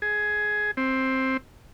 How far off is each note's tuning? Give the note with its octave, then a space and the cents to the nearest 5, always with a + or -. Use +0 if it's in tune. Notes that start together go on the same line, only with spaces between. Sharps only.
G#4 +15
C4 +10